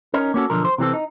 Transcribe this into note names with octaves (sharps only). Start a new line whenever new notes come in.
C#4 D#4 A#4
A#3 C#4 F#4 A4
B1 D3 F3 A#4
C5
C3 E3 C4 A4
D#4